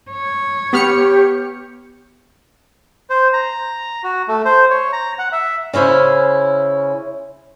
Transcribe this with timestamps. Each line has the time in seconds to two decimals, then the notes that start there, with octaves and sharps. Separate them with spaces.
0.11 C#5
0.73 B3 G4 F6 C#7
3.10 C5
3.33 A#5
4.04 F#4
4.28 A3
4.45 C5
4.70 C#5
4.93 A#5
5.19 F#5
5.32 E5
5.73 C#3 C#4 E4 C5